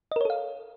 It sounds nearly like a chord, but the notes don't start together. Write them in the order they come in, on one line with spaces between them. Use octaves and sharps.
D#5 A#4 C#5 A4 F5